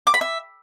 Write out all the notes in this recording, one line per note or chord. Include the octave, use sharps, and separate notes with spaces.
D6
B5
E5